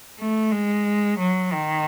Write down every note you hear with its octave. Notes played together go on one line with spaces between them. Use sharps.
A3
G#3
F#3
D#3